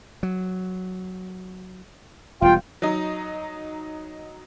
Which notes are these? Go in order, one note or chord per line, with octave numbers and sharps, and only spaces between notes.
F#3
E1 G3 F4 G5
F#3 D#4